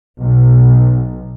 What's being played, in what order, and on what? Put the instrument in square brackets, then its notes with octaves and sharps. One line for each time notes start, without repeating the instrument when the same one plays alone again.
[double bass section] B1